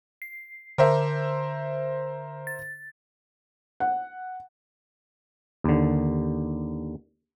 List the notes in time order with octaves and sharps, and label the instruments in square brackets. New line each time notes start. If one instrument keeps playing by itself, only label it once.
[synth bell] C7
[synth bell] D3 [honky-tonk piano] A#4 C5 E5
[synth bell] A6
[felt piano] F#5
[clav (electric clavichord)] D#2 D3